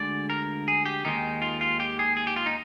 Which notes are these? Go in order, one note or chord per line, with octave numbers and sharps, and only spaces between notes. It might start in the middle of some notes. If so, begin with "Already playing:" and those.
Already playing: D2 D3 G#3 D5
A#4
G#4
G4
D#2 D#3 G#3 D#4
F4
F4
G4
G#4
G#4
G4
F4
D#4